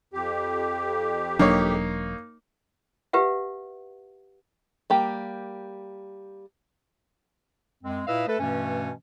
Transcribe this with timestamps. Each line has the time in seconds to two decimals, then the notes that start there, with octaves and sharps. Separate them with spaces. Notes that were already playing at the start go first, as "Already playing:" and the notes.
0.13 F2 G4
1.39 E1 F#3 A#3 D4 D#4 C#5
3.13 G4 B4 E5 F#5
4.90 G3 A#3 G4
7.84 F#2 G#3 C4
8.07 A#2 E4 B4 D#5 F5 E6
8.28 A3 A4 B4
8.40 G2 B2 E3 A3 C#4